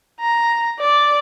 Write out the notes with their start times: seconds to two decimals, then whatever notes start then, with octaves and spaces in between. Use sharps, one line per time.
0.20 A#5
0.79 D5